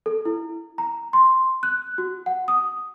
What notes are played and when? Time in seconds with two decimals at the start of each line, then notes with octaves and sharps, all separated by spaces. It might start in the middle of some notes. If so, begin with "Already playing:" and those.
0.06 A4
0.25 E4
0.78 A#5
1.13 C6
1.63 F#6
1.98 F#4
2.26 F#5
2.48 D#6